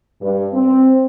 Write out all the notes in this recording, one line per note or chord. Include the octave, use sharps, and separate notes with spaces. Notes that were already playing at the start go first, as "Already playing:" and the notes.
G2
C4